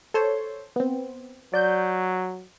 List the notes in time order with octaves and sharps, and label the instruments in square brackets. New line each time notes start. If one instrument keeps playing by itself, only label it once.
[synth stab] A4 C5 C#5
B3 C4
[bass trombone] F#3 [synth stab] D5 G6